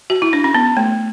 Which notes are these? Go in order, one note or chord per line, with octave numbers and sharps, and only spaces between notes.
F#4
E4
D4
C#4
B3
A3